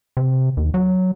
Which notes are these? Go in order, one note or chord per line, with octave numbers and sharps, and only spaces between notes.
C3
D#2
F#3